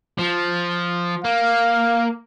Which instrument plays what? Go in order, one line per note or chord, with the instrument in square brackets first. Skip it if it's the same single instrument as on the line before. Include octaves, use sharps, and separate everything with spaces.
[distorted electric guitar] F3
[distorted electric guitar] A#3 [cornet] F5